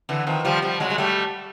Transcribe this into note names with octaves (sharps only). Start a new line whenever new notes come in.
D3 E3
D#3 F3
F3 G3
F3 G3
F#3 G#3
G#3
G3 A3